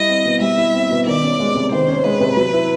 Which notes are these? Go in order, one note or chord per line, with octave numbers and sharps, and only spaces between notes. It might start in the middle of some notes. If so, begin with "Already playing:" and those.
Already playing: G3 E4 D#5
C4
B2
G3 E5
E4
C4
B2
D#3 D5
C#4
G#3
C3
D#3 C5
C#4
G#3 B4
C3
F#3
E4